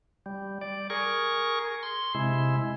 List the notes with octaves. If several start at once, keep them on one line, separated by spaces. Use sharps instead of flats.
G3
D5
G#4 A#4 C#6
C6
C3 G#3 E4